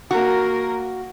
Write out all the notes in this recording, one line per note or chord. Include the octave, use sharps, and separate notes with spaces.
A#3 F#4 A#4